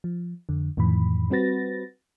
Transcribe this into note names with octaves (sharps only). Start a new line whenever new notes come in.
F3
F2 D3
F2 A2 D#3 E3 B5
G3 C4 F#4 B4 A6 A#6